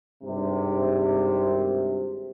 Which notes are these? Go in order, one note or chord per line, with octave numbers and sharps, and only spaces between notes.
G#1 G2 C3